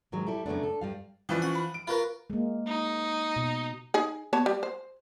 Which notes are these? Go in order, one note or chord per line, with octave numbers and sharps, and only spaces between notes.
G#2 D#3 F#3 G#3
G3 E4 A4
F#2 C#3 A3 B3 D4
A4
G2 G3 F5
E3 F3 C#4 E4 B4 D5
C#4 F#4 F#5
B5
D7
F4 F#4 A#4 B4 B5
G#3 A#3
D#4
B2
D#4 G#4
B3 C#5 A5
G3
C5